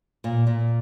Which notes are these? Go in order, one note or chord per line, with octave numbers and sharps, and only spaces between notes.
A#2
A#2